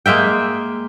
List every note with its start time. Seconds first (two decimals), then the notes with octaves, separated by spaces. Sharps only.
0.06 G#3 A#3 E5 G5